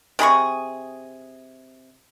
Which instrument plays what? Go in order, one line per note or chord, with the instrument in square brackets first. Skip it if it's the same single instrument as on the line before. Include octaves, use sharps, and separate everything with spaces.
[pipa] C3 G#4 B5 C#6